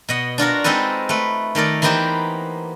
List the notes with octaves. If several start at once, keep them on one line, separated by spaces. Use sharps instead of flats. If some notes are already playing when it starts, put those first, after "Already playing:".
B2 D#5 F#5
D4 F4 F#4 A#4
G#3 C4 D#4 A4 B4
A3 B4
D#3 A3 A#4 D5
E3 A#3 B3 D#4 G4 C5